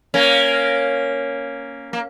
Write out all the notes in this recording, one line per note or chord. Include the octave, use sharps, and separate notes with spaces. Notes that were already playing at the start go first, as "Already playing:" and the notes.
A#3 C#4
A#3